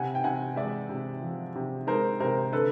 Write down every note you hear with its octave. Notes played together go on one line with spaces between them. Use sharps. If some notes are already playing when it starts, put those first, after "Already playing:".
Already playing: C3 F#5 G#5
G5
C3 F#5 G#5
G#3 D5 E5
C3
F3
C3
G#3 A#4 C5
C3 A#4 C5
D3 A4 B4